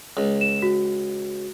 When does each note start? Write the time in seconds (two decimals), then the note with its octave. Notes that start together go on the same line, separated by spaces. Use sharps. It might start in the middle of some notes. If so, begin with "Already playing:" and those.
0.17 C#2
0.41 E7
0.62 F#4